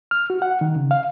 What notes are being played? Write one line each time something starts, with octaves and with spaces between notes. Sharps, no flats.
F6
F#4
F#5
D#3
C#3
F5